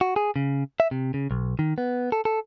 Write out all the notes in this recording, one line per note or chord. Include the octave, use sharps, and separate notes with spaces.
F#4
G#4
C#3
E5
C3
C#3
B1
D#3
B3
A4
A4